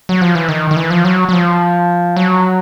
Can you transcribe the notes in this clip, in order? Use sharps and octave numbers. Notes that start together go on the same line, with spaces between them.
F#3
F3
E3
D#3
D#3
E3
F3
F#3
F#3
F3
F#3